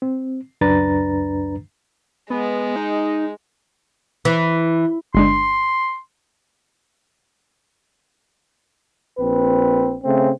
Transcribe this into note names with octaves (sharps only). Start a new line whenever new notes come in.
C4
C#2 F#2 D4 B4 A#5 A6
G#3 B3
D#4
E3
G1 G#3 D4 C6
A#1 C4 B4
C#3 A3 C4